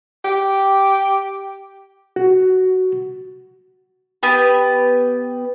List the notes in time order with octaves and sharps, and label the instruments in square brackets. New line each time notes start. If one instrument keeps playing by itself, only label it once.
[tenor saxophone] G4
[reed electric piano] F#4
[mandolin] B3 G4 B4